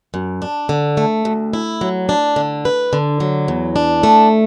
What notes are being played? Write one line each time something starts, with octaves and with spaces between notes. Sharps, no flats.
F#2
D4
D3
A3
D2
E4
F#3
D4
D3
B4
D3
F#3
E2
D4
A3